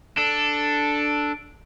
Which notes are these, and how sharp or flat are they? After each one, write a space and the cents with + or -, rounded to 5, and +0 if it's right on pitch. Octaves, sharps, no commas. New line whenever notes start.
D4 +0 A4 +0